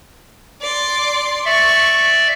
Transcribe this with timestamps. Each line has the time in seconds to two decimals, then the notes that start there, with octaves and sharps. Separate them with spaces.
0.62 D5 C6
1.45 D5 E5 C#6